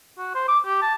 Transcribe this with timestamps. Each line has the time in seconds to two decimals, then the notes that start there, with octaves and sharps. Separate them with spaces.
0.18 F#4
0.35 C5
0.48 D6
0.66 G4
0.82 A5